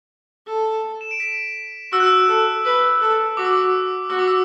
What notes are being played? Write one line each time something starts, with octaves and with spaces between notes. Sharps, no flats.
A4
E7
D7
B6
F#4 E6
F#6
E6
A4
B4
A4
F#4 D6
E6
D6
F#4 E6
D6
E6